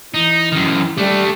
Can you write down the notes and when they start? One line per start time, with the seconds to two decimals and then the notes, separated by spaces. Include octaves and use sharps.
0.14 E3 D#4
0.52 F#2 D#3
0.98 G3 A3 D4